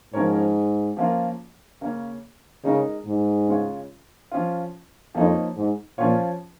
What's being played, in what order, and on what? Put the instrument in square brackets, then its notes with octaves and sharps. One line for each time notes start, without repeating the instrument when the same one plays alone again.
[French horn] G#2 [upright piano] F3 C#4 A#4 C#5
[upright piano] F3 A#3 C#4 F4 A#4
C#3 A#3 C#4
[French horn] C#3 [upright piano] G#3 D#4 A#4
[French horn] G#2
[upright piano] C#3 G#3 F4 C#5
F3 C#4 F4
[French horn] F2 [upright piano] F3 A#3 D#4 C#5
[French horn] G#2
[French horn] A#2 [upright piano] F3 C#4 F4 C#5